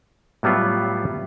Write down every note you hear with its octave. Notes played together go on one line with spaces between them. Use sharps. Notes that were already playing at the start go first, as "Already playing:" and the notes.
A2 F#3 G3 B3 F4